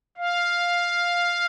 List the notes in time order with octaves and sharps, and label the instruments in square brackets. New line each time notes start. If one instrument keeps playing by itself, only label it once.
[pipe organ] F5